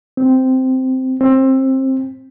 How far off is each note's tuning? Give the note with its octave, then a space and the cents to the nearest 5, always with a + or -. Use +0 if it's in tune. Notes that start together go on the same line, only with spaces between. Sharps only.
C4 -10
C4 +20